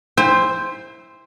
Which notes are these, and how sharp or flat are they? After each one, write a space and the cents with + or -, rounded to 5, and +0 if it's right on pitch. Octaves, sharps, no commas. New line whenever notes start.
E4 +0 C5 +0 G5 +45